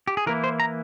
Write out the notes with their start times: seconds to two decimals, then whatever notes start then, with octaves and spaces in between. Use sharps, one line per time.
0.07 G4
0.17 G#4
0.26 E3 A#3 E4 A#4
0.44 C5
0.60 A#5